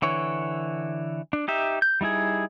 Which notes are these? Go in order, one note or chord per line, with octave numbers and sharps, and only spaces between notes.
D3 E3 C#5
D4
D#4 G4 E5
G6
G3 D#4 E4 G#4